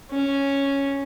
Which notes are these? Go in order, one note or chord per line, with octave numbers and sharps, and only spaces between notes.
C#4